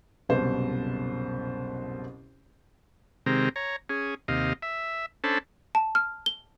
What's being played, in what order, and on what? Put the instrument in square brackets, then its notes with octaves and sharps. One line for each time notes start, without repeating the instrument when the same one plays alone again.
[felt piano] F#1 C2 B2 C5
[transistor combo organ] C3 D#3 G#3 C4 A#5
C#5 A#5
C#4 G#4
D#2 C3 D#5 F5
E5
C#4 D4 A4 C5 A5 B5
[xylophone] A5
F6
G7